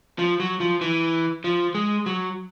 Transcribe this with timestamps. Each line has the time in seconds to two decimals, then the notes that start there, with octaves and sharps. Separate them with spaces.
0.19 F3
0.40 F#3
0.60 F3
0.81 E3
1.44 F3
1.75 G#3
2.06 F#3